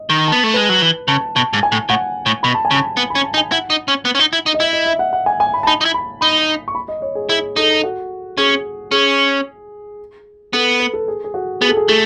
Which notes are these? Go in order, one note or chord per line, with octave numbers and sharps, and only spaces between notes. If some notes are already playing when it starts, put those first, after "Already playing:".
Already playing: D#5
D#3
A5
B3
A3
G#3 B4
F#3
E3
C#3 A5
B2 A5
G#2
G#5
A2
A2 F#5
A2
B2 B5
A5
G#5
C#3
A5
B3 A5
B5
C#4
A5
D#4
G#5
E4 F#5
D#4
C#4
B3
C#4
D#4
E4
D#4
D#5
E4 E5
D#5
E5
F#5
F#5
G#5
G#5
B5
A5
D#4 B5
D#4
E4
B5
D#4 B5
C#6
B5
D#5
C#5
G#4
E4 G#4
D#4 A4
F#4
C#4 G#4
C#4 G#4
B3 A4
B4
A4
G#4
G#4
F#4
B3 G#4
A4
G#4
A3 A4